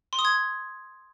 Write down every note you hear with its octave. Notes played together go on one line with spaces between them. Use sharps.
C6
D#6
G#6